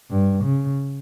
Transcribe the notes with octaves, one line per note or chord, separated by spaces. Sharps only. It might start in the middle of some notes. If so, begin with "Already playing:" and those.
G2
C#3